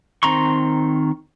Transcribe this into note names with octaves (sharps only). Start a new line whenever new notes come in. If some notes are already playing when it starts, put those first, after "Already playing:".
D#3 C4 A#5 C6 C#6